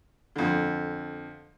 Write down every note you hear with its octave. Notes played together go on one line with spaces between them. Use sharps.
F2 D3